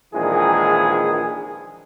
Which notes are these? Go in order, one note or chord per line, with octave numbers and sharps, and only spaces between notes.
A#1 D#3 E3 G#3 G#4